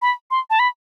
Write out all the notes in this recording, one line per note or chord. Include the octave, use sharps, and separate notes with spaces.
B5
C6
A5
B5